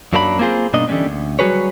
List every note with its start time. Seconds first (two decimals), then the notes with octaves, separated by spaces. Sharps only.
0.13 F#2 F#3 A#3 D4 A#4 B5
0.39 A#3 C4 F4 G#4 C5
0.73 G2 B2 A#3 D4 D#4 D#5
0.88 D3 E3 G3 G#3 C#4 D4
1.06 D2
1.39 F#3 G3 F#4 G#4 B4 C#5